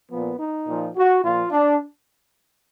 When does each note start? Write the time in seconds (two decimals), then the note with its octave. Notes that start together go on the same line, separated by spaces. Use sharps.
0.11 A#2 F3 B3
0.40 D#4
0.68 A#2 F3
0.96 F#4
1.23 A#2 F3 F4
1.52 D4